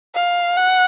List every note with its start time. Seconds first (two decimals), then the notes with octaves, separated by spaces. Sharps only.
0.15 F5
0.57 F#5